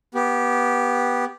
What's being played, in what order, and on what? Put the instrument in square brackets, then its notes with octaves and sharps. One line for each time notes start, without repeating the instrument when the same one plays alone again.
[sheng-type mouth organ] B3 G4